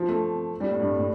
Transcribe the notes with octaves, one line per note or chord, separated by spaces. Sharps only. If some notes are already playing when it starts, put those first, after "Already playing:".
Already playing: F3
A3
G3
A2
G2
A2
A2